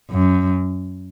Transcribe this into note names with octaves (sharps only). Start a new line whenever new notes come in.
F#2